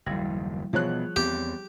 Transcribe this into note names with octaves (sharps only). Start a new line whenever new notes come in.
F#1 D#2 F3 G3 E4
B2 E3 F3 B3 G#4 C#5 F#6
E2 B3 C4 G4